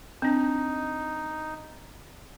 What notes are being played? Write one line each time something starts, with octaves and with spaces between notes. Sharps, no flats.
C4 D4 D#4